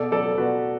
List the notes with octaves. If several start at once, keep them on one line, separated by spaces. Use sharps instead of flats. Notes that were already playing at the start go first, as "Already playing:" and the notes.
Already playing: B2 A4 D5
F#3 A4 D5
D5
B2 F#4 B4